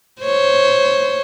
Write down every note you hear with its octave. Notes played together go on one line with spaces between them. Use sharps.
C5 C#5